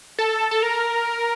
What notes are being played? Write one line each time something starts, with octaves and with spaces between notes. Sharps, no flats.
A4
A4
A#4